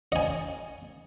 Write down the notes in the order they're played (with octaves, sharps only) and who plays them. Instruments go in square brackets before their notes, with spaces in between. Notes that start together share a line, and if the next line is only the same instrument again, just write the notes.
[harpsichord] D#5 G#5